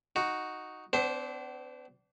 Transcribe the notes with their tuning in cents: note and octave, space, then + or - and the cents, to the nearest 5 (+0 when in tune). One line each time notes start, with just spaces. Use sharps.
D#4 +0 F#4 +0
B3 +45 D4 -25 C5 +0